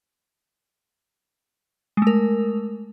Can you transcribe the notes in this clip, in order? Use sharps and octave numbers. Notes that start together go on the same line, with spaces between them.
G#3 A3 A#4